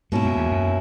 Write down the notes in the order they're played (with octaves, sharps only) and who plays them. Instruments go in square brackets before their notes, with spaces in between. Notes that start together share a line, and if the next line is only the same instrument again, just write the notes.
[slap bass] G#2 [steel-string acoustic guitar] B2 A#3 C#4 E4
[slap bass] F#2
E2
F#2